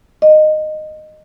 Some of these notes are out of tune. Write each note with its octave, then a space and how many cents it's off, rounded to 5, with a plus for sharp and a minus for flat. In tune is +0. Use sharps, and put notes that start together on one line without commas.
D#5 -15